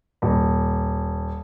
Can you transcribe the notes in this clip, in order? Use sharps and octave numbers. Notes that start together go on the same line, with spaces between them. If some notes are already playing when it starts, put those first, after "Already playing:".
D#1